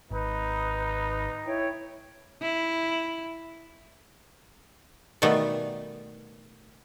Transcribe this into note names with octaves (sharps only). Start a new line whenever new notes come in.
G#1 D#4 B4
E4 C#5 G5
E4
B2 D#3 G3 A3 B3 B4